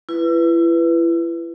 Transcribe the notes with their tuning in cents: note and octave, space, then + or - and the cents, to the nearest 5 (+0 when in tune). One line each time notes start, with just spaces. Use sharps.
E4 +35 B4 +0